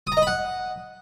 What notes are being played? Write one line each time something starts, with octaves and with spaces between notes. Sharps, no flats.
D#6
A#5
D#5
B5
F#5